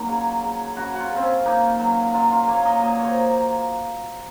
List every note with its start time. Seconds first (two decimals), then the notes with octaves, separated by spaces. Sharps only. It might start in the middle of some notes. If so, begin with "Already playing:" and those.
Already playing: F#3 A#3 D#4 F4
0.09 C#3
0.42 C#3
0.77 C#3 F#4
0.93 F#4
1.00 F4
1.11 C#3
1.16 C4
1.22 C#4
1.46 A#3 D#4
1.79 F#3
2.14 F#3 F4
2.31 F4
2.48 A#3 C#5
2.65 D#5
2.82 A#2 D#5
2.99 C5 C#5